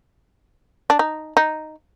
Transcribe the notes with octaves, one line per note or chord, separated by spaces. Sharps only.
D4
D#4
D#4